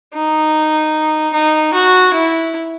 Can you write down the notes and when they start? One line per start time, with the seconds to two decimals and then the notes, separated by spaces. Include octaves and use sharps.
0.14 D#4
1.34 D#4
1.74 F#4
2.14 E4